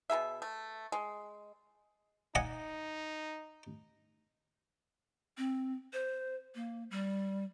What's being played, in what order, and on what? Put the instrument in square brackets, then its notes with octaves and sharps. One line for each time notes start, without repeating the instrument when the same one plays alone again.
[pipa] B2 A#3 G#4 E5
A3
G#3
[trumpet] D#4 [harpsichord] D#5 F#5 G#5
[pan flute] C4
C5
A#3
G3